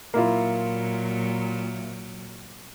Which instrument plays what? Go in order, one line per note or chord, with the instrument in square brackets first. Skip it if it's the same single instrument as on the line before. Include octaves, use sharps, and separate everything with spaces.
[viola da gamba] A#2 F#3 [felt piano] A#3 E4 F4